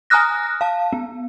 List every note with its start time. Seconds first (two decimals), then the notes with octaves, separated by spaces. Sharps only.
0.10 G#5 A#5 D#6 F6 F#6 A#6
0.61 F5 A5
0.93 B3